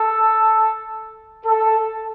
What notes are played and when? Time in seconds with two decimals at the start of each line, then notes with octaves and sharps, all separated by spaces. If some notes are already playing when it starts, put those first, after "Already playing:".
Already playing: A4
1.46 A4